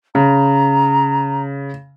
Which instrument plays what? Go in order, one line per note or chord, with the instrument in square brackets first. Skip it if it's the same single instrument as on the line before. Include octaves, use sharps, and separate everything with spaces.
[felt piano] C#3 [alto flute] A#5